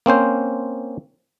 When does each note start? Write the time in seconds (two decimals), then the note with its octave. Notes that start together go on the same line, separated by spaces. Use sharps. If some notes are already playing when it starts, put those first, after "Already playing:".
0.06 A#3 C4 C#4 C5